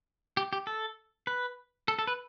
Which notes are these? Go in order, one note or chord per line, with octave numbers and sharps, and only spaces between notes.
G4
G4
A4
B4
A4
A4
B4